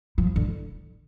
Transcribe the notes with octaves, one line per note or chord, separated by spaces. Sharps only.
F3
D3